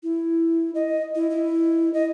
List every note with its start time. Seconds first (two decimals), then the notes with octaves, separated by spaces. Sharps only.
0.03 E4
0.75 D#5
1.15 E4
1.30 E4
1.94 D#5